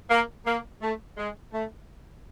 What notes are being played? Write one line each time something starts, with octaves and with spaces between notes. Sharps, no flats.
A#3
A#3
A3
G#3
A3